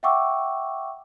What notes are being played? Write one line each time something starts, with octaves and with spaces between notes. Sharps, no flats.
E5 F#5 G5 C#6 D6 E6